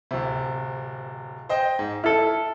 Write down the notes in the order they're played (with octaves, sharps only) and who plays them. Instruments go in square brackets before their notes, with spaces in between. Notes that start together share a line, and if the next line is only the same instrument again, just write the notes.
[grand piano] D1 C3
C5 D#5 G5
G#2
[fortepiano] E4 A4 [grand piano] F6